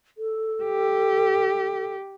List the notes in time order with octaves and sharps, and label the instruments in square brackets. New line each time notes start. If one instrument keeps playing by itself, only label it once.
[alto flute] A4
[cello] G4